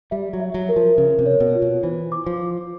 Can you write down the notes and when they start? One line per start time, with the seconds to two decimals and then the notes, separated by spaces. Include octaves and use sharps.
0.11 G3 E5
0.33 F#3
0.40 E5
0.54 F#3
0.69 A#4
0.76 F3
0.97 C#3 A#4
1.19 C3
1.26 C#5
1.40 B2
1.55 F4
1.62 B2
1.83 E3 C5
2.12 D6
2.26 F3
2.40 D6